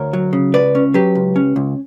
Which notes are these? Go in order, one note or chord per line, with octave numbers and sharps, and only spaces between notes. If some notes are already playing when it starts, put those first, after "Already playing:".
Already playing: D2 A#4 C#5
F#3
C#3
C#2 B4 D5
C#4
F#3 G4 B4
C#2
C#4
C#2